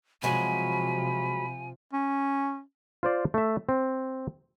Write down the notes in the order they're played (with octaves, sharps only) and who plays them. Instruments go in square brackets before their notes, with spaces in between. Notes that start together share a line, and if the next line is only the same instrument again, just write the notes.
[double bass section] C3 F3 [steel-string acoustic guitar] F#3 G#3 F#4 [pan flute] G#5 [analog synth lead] B5
[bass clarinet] C#4
[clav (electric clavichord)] F4 C5 D5
A3 E5
C4